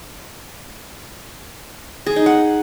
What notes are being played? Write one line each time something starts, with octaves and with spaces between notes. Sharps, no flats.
G#4
D#4
F#5